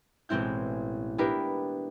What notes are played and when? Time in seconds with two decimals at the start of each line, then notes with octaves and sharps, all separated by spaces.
0.29 A1 B2 G#3 C4 E4 G6
1.18 B3 D4 E4 G4 A#4 B4